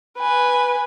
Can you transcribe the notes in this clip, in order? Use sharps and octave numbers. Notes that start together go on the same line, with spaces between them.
B4 G#5